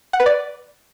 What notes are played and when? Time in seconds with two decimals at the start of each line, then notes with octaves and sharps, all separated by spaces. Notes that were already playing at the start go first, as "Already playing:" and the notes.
0.13 F#5
0.20 B4
0.26 D5